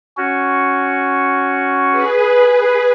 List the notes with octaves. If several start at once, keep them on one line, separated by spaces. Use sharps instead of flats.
C#4 F#4
G#4 B4